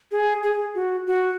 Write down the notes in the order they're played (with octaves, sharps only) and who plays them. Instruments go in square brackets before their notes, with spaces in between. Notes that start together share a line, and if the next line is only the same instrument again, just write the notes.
[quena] G#4
G#4
F#4
F#4